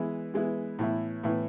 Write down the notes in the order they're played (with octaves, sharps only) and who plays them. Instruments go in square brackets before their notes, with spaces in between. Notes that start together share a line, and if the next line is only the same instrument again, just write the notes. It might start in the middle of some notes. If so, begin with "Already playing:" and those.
Already playing: [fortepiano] E3 G#3 B3 E4
E3 G#3 B3 E4
A2 E3 B3 E4
A2 E3 B3 E4